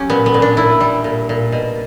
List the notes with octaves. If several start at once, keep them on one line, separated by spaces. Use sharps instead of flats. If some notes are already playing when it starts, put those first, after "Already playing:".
Already playing: F#3 C#4 G4
A#2 B3
B3
A#2
D4
A#2 E4
G3
A#2
A#2
B2